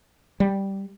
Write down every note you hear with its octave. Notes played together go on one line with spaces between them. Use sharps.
G3